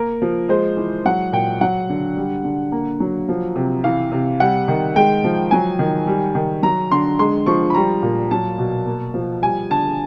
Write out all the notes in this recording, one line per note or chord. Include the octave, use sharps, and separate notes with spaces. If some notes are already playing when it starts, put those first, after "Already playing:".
Already playing: A#3 A#4
F3
G#3 C5
E3
F#3 F#5
A#2 G5
F#3 F#5
D3
G3
D3
A#3
F#3
F3
C3
E3 F5
C3
G3 F#5
D#3
G#3 G5
F3
F#3 G#5
D#3
G3
D#3
F#3 A#5
D3 C6
G#3 C6
F3 C#6
B5
G3 A#5
A#2
F#3 A5
B2
A#3
F3
G3 G#5
D3 A5